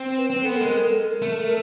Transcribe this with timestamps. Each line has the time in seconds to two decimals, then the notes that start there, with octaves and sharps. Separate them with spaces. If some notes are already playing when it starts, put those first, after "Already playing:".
Already playing: C4
0.18 B4
0.29 C4 B4
0.43 B3 A4
0.53 A#4
0.61 G#3
0.75 A4
0.91 A4
0.99 A#4
1.22 A3